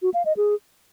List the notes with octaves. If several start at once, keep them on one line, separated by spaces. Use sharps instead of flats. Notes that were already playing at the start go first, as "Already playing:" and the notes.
F#4
F5
D#5
G#4